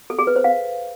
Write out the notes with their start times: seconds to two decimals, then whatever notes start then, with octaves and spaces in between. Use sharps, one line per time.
0.10 A4
0.19 G#4
0.27 B4
0.36 C5
0.44 F5